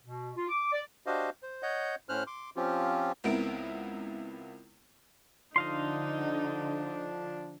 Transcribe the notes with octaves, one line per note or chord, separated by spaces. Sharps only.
B2
F4
D6
D5
D4 F#4 G4 C5 D#5 F5
C5
C#5 D#5 F#5 G6
A2 C#4 C5 F6 F#6
C6 D6
F3 C4 C#4 F4 G4
C#2 B3 C4 E4 A#4 D7
D3 F3 D4 D#4 D#5 F5 C6